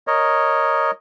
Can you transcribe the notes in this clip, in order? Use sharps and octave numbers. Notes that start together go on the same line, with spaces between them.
A#4 C#5 D#5